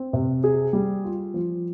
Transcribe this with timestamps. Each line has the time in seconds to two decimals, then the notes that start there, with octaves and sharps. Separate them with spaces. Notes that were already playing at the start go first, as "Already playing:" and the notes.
Already playing: C4
0.13 C3
0.44 G#4
0.73 G3
1.04 F4
1.34 F3